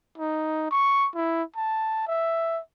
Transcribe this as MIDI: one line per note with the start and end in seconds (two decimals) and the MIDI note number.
0.18 0.69 63
0.71 1.08 85
1.15 1.43 64
1.56 2.05 81
2.07 2.60 76